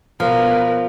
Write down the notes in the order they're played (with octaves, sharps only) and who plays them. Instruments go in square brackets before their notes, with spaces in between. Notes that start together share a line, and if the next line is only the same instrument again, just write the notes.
[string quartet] B2 A#4 B4 [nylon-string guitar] F3